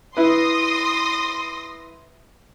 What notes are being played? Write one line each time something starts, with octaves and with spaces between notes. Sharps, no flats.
E4 B4 C6 D#6 A#6